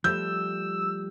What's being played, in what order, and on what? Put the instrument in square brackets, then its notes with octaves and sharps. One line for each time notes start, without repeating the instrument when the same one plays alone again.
[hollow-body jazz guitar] F3 G3 A3 [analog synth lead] E6 [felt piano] G6